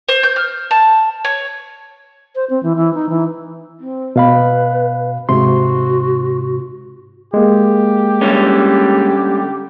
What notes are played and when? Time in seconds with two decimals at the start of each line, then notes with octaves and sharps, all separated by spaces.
0.09 C5
0.23 G6
0.36 F6
0.71 A5
1.25 C#5
2.35 C5
2.50 C4
2.63 E3
2.76 E3
2.94 D#4
3.09 E3
3.80 C4
4.16 B2 B4 F5 B5
5.29 G#2 C3 F#4 C6
7.34 G#3 A#3 G4
8.21 D3 G3 C#4